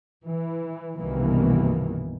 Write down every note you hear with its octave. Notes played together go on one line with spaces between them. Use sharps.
E3
G1 C2 B2 D#3 E3 A#3